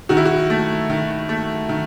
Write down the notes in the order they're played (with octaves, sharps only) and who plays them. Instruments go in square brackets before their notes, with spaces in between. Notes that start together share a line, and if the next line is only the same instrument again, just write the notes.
[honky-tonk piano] D#3 F#4
E4
F#4
A3
D#3
A3
D#3